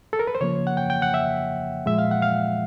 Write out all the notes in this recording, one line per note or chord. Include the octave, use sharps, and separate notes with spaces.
A4
A#4
B4
C5
C#3 F3 A#3 C#5
F#5
G5
G5
F#5
E5
A#2 F3 G#3 E5
F5
F#5
F5